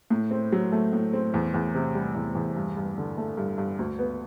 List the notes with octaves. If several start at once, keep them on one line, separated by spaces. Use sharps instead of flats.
A2
C4
F#3
A3
A2
C4
E2
E2
C3
G3
E2
E2
G2
G2
D3
A3
G2
G2
D2
B3